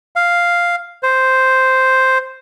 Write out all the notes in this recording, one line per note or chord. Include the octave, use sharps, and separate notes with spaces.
F5
C5